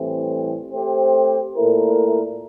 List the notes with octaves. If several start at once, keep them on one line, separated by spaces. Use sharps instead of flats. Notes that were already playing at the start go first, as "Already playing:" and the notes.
Already playing: A2 E3 G3 C4
A3 C4 G4 C5
A#2 A3 E4 A#4